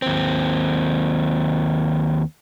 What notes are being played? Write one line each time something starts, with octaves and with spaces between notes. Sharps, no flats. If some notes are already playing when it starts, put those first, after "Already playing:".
D#2 C4